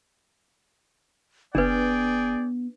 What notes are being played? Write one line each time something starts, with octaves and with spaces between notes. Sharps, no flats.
F#1 B3 D4 G#4 B4 D5 G5